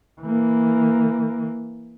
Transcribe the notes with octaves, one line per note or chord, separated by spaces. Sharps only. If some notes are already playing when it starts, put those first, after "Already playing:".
E3 A#3